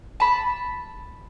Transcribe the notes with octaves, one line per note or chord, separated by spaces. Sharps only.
A5 B5